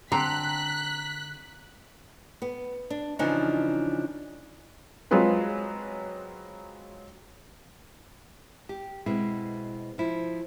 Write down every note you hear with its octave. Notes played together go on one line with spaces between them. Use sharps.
D3 C4 A#5 F#6 B6
B3
D4
C#3 E3 F3 D4 D#4
F#3 G#3 C4 F4 G#4 B4
G4
B2 G#3 C4 E4
F3 E4